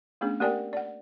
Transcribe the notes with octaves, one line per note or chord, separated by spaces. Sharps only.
A3 B3 C#4 D4 G#4
A#3 G4 A#4 D5 G5 G#5
D5 F#5